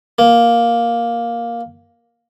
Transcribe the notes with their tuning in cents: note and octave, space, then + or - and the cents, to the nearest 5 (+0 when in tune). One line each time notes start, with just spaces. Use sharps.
A#3 +5